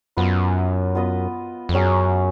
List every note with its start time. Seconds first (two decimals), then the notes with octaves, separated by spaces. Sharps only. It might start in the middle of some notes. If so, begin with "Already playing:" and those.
0.17 F#2 B3 F4 B4 D#5
0.95 B3 F4 B4 D#5
1.69 F2
1.74 F#2 F#3 C#4 G#4 C#5